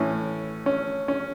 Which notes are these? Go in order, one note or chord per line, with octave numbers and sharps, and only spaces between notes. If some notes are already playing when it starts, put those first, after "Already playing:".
Already playing: A2 E3 C#4
C#4
C#4